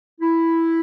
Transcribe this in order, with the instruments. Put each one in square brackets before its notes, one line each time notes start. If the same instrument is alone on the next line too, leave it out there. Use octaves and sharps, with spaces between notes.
[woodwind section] E4